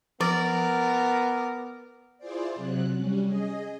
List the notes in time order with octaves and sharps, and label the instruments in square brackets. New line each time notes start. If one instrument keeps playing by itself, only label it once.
[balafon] F3 [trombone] B3 [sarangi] A#4 [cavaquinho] D5
[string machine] E4 F4 G#4 C5 D5
C3 F#3 F#6
G3 C#4
G#4 D#5